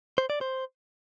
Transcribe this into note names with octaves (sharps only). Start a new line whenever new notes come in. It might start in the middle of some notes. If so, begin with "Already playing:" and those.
C5
D5
C5